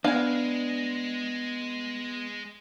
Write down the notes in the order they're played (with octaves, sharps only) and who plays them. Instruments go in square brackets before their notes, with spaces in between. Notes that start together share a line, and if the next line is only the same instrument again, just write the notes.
[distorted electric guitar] G#3 [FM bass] B3 [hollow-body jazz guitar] D4 B4 [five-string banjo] F5 G#5